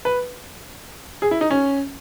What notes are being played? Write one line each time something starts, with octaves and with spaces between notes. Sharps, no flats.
B4
G#4
E4
D#4
C#4